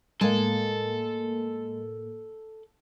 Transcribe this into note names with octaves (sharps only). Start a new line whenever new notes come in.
A2 G#3 A#3 A4 G#5